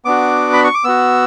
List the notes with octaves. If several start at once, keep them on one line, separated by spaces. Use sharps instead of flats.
B3 D4 F#4 D6
B5
C#6
D6
B3 F#4 E6